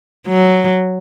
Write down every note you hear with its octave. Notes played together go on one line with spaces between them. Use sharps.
F#3